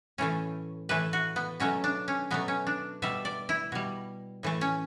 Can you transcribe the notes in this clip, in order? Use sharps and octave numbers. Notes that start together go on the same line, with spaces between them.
A2 E3 A3 C#4
A2 E3 A3 B4
F#4
B3
B2 F#3 A3 C#4
D4
C#4
B2 F#3 A3 B3
C#4
D4
B2 G3 E5
D5
E4
B2 G3
A2 E3 A3
C#4